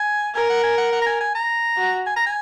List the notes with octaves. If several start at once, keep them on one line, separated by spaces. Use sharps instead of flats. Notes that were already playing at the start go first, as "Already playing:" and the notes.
Already playing: G#5
A#4 G#5
F#5
G#5
F#5
F#5
A#5
G#5
G#5
A#5
F#4
G#5
A#5
G#5